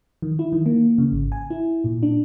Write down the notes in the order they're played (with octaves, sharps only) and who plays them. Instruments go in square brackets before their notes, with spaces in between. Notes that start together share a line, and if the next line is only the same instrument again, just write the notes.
[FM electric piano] D#3
E4
D#3
A#3
C#3
G#1
G#5
E4
A#2
D4